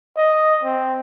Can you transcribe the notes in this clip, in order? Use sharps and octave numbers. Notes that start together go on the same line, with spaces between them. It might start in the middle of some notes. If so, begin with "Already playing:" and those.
D#5
C4